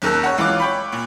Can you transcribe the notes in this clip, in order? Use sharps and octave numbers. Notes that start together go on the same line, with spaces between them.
F#1 D#2 A#4 E6 F#6
C#5 F#5
C#2 E3 C#4 F4 D6 F#6
C#5 G5 B5
A#2